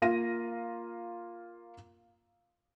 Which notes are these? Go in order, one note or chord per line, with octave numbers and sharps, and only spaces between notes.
A#3 F4 F5 A#6 D#7